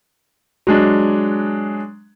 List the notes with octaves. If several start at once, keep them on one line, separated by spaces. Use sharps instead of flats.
F#3 G#3 D4